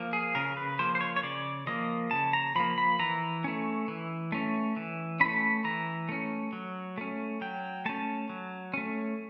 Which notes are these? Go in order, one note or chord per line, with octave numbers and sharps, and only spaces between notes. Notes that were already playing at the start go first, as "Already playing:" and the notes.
Already playing: F3 A#3
G#4
C#3 A#4
B4
F3 A#3 C5
C5
C#5
C#5
C#3 D5
F3 A#3 D#5
C#3 A5
A#5
F3 A#3 B5
B5
E3 A#5
A3 C#4
E3
A3 C#4
E3
A3 C#4 B5
E3 A#5
A3 C#4
F#3
A3 C#4
F#3 G5
A3 C#4 A5
F#3
A3 C#4